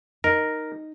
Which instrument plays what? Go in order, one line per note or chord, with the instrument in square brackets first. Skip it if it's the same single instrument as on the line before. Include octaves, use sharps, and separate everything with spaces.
[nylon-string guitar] D#4 [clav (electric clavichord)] A#4